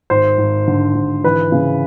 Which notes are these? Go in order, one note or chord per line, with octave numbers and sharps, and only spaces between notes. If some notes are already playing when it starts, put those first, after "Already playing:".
G#1 C5
G#1
D3
G#1
E3 B4
C#3